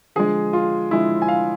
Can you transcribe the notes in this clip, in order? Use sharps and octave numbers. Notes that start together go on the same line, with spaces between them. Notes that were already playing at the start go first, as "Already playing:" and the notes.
D3 F3 G#3 G#4
F4
D3 F3 G#3 E4
G#5
F5